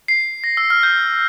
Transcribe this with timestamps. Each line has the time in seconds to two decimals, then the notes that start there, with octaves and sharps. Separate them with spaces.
0.08 C7
0.44 A#6
0.57 E6
0.70 F6
0.83 G6